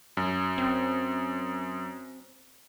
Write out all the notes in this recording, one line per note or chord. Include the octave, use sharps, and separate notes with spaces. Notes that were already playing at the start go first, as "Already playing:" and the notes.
F#2
C4